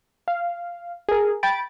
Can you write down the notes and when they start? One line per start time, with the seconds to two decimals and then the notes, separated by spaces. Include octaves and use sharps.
0.28 F5
1.09 G#4 A#4
1.43 G5 B5 A6 D7